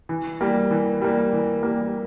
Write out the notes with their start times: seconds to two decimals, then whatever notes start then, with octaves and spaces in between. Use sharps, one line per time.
0.09 E3
0.41 G3 A#3
0.71 E3
1.01 G3 A#3
1.32 E3
1.63 G3 A#3